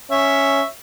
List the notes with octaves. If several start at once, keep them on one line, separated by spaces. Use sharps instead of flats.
C#4 C#5 E5